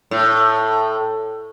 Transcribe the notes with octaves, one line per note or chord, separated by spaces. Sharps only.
A2